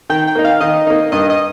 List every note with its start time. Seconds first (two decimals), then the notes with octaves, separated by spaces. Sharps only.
0.10 D#3 G5
0.27 G5
0.35 A#3 D#4
0.45 F5
0.61 D#3 D#5
0.87 A#3 D#4
1.12 G2 D#5
1.30 D#5